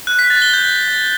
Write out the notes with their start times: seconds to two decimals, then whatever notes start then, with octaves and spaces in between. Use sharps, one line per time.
0.07 F#6
0.19 B6
0.30 A6
0.42 G7
0.53 G6